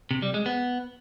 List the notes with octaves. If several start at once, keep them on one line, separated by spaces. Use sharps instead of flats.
C3
G3
G#3
B3